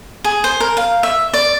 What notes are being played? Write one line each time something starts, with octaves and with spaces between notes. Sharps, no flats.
G#4
C5
A#4
F5
E5
D5